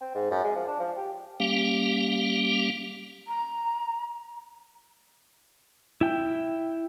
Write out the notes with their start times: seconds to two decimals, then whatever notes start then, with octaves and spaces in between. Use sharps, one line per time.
0.01 C4
0.15 G#2
0.31 F#2
0.44 G#3
0.55 F3
0.67 D4
0.80 F3
0.97 G4
1.40 G3 A#3 C#4 G4 F5
3.27 A#5
6.01 E4 G5